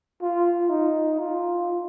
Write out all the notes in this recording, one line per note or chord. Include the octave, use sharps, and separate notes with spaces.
F4
D#4
F4